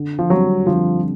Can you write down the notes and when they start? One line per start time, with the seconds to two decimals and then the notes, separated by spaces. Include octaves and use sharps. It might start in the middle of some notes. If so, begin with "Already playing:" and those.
Already playing: D3
0.19 F3
0.30 F#3 G3 C4
0.66 D3 F3